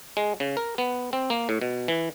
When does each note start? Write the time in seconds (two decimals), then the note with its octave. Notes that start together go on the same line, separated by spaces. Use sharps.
0.17 G#3
0.40 C#3
0.57 A#4
0.78 B3
1.13 C4
1.30 A#3
1.49 A2
1.61 B2
1.88 E3